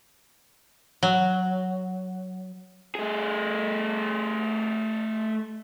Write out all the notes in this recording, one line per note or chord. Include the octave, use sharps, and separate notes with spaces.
F#3
A3 G#4